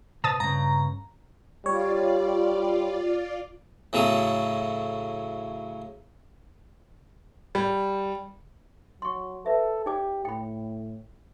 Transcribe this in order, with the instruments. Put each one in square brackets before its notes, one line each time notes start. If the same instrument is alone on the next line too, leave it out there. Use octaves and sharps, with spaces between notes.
[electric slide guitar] B2 C5 [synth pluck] A5 D#6 A6
[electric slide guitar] G2 C#3 [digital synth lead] A#5
[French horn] G3 [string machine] F4 D5 [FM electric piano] C#5
[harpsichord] A2 C#3 F#3 A4 D#6
[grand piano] G3
[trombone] F#3 [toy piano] C6 C#6
[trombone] A4 [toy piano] B4 E5
[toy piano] D#4 D5 D6 [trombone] G4
[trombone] A2 [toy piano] G5 B5